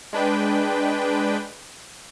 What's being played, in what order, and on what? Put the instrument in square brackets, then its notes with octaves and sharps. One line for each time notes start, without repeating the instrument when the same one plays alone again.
[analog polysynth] G#3 D4 B4 G5